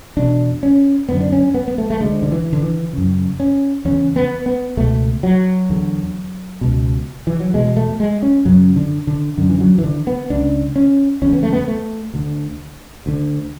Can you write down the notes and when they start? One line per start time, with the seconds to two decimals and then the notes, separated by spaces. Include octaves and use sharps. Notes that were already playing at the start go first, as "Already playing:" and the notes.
0.17 E2 B2 D4
0.63 C#4
1.09 F#2 D3 B3
1.20 D4
1.32 C#4
1.54 B3
1.68 B3
1.78 A3
1.90 A3
2.01 D2 D3 G#3
2.23 D3
2.32 E3
2.53 D3
2.62 E3
2.93 F#2 C#3
3.40 C#4
3.85 E2 C#3 C#4
4.16 B3
4.46 B3
4.77 C#2 B2 A3
5.23 F#3
5.69 E2 D3
6.61 C#2 B2
7.27 E3
7.40 F#3
7.53 E2 B2 G#3
7.76 A3
8.00 G#3
8.22 C#4
8.45 F#2 C#3 F#3
8.76 D3
9.07 D3
9.37 F#2 D3
9.49 E3
9.61 F#3
9.78 E3
9.84 D3
10.07 B3
10.30 C#2 C#3 D4
10.76 C#4
11.22 E2 C#3 C#4
11.33 B3
11.43 A3
11.53 B3
11.68 A3
12.14 D2 D3
13.06 D2 D3